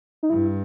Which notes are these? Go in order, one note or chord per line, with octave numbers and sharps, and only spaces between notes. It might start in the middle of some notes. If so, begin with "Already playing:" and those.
D#4
G2 E4